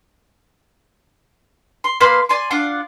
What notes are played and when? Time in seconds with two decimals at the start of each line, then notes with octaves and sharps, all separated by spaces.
1.84 C6
2.01 A#3 B4 F5 C6
2.29 D5 G#5 C6
2.51 D4 F4 D5 F#5